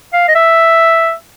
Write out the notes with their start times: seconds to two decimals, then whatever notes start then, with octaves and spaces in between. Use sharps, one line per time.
0.13 F5
0.28 D#5
0.35 E5